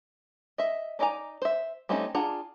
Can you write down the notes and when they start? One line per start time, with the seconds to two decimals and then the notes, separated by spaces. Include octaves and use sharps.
0.58 D#5 E5
0.99 D4 D#4 D5 G#5 A#5
1.42 C5 E5
1.89 G3 A3 C4 C#4 D#4
2.15 D4 F4 G#4 F#5 A#5